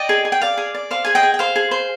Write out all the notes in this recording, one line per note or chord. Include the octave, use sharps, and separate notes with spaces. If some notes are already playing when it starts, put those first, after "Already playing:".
Already playing: D5 D#5 G5
G#4
G#4
G5
D5 F5
G#4
D5
C5 F5
G#4 G#5
D#5 G5
G#4
G5
C5 F5
G#4
C5